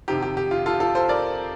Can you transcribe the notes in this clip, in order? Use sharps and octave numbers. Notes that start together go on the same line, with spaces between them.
F2 C3 D#3 G4
G4
G4
F4
F4 A4
F4 A4
A4 C5
A#4 D5